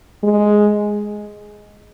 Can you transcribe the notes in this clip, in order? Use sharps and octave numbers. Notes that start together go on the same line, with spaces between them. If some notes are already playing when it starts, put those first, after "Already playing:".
G#3